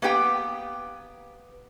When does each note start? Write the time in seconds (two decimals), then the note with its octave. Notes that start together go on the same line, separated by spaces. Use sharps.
0.02 A#3 B3 G4 G5